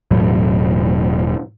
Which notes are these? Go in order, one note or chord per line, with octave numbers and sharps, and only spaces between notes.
E1 A2 F#3